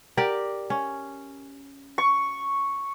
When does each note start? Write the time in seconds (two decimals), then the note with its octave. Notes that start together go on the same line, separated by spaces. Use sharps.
0.17 G4 A#4 D5
0.70 C#4
1.98 C#6